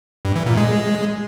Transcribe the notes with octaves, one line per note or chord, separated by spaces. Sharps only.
G2
E3
A#2
G#3